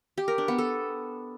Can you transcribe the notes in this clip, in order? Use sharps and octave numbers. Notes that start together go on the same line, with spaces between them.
G4
A#4
D4
B3
A4